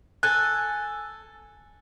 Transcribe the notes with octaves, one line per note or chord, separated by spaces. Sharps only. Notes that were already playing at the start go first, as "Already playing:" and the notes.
A4 G#5 F#6